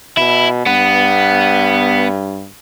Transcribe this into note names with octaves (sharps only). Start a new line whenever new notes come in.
B2 E4
G2 B3